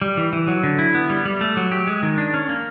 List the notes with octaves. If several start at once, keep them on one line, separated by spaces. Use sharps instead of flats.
G3
E3
E3
F#3
D3
E4
B3
G3
G3
A3
F#3
G4
G#3
D#3
D4
C#4
A#3